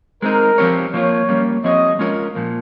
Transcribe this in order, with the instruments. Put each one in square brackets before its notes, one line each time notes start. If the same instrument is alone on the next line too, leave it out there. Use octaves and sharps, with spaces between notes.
[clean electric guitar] G#3 C4 D#4 [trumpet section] A#4
[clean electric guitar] F3 C4 G4 C#5
[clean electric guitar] F3 A#3 F4 [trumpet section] C#5
[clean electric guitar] G3 A#3 C#4
[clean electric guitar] F3 C4 G4 C#5 [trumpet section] D#5
[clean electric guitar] G#3 C#4 F4 A#4 C#5
A#2 F3 A#3